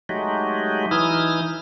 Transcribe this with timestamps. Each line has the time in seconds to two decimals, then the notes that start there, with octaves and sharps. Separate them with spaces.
0.09 F#3 G#3 A3 D#4 F#4 G4
0.91 E3 D#4 E4 D#6 F6